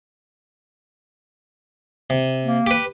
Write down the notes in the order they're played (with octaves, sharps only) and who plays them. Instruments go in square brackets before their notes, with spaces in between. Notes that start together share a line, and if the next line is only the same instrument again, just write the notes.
[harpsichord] C3
[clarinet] A#3
[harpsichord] G4 B4